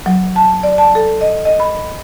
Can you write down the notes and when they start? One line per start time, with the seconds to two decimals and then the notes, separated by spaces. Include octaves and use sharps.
0.06 F#3
0.36 A5
0.63 D5
0.78 A5
0.95 A4
1.21 D#5
1.45 D#5
1.60 B5